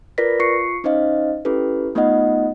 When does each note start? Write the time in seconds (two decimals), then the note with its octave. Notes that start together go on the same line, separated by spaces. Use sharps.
0.18 F4 A#4 B4 D5 A#6 B6
0.40 F4 C#6 C7 C#7
0.84 C#4 D#4 C5 D#5 F5
1.45 C#4 E4 G4 A4 B4
1.95 A3 B3 D#4 F4 D#5 F#5